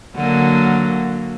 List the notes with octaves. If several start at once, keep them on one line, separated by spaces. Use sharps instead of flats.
D3 F#3 A#3